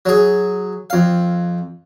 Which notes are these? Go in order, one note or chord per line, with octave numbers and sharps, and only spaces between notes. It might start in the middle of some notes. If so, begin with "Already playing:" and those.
F#3 G#4
F2 F5